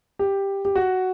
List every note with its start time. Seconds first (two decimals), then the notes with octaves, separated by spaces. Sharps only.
0.19 G4
0.65 G4
0.75 F#4